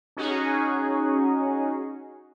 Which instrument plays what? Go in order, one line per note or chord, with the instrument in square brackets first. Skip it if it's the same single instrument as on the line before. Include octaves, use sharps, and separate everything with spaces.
[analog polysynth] C#4 D#4 F#4 G#4